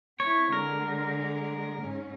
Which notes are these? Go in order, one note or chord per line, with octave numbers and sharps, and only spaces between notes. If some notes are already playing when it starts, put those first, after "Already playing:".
C4 E4 C#5
D3 G#3 A#4
G#2 C#4